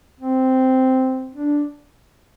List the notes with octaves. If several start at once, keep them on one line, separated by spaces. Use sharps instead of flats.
C4
D4